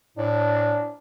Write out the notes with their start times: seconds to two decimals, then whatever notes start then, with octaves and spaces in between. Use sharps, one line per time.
0.18 A2 D4